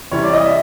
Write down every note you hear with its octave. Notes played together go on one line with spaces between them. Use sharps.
C3 E3 G3 C#5
D5
D#5
E5